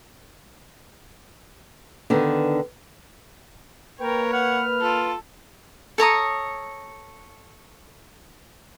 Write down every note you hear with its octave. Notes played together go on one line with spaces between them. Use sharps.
D3 D#3 B3
A#3 A#4 B4 C#5 G5
F#5 F6
F4 A4
A4 C#5 A#5 D#6